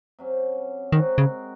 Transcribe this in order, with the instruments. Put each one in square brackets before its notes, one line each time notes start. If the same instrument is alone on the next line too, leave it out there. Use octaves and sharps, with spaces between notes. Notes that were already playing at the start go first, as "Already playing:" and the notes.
[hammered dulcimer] C3 F#3 C#4
[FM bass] D#3 [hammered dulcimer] G#3 C4 F#4 A#4
[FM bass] C#3